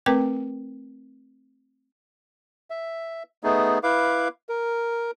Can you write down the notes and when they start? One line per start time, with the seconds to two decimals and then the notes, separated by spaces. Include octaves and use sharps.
0.06 A3 C4 A#4 B4 G5 D6
2.70 E5
3.43 A3 B3 D#4 G#4
3.83 E4 B4 F5 D6
4.49 A#4